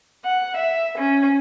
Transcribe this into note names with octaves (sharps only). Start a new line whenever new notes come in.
F#5
E5
C#4